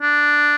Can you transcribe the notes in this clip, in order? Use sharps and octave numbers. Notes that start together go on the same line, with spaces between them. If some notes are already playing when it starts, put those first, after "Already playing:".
D4